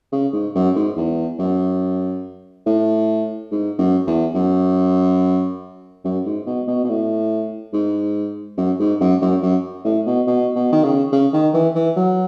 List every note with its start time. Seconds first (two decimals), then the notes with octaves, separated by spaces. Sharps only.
0.12 C#3
0.33 G#2
0.55 F#2
0.76 G#2
0.97 E2
1.39 F#2
2.66 A2
3.51 G#2
3.78 F#2
4.07 E2
4.35 F#2
6.04 F#2
6.26 G#2
6.46 B2
6.67 B2
6.84 B2
6.89 A2
7.73 G#2
8.57 F#2
8.79 G#2
9.00 F#2
9.21 F#2
9.42 F#2
9.85 A2
10.06 B2
10.27 B2
10.55 B2
10.72 D#3
10.84 C#3
11.12 C#3
11.33 D#3
11.54 E3
11.75 E3
11.96 F#3